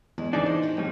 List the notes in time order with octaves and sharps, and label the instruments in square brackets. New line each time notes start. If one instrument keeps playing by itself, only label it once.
[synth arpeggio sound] E2 [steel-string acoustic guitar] G#3
[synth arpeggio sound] E3 G#4 D5 [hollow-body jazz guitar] D4 D#4
[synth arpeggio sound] C5 [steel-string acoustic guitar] D#5
[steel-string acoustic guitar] E4 F#4 G4
[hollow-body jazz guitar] F2 A2 G3 [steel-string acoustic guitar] A4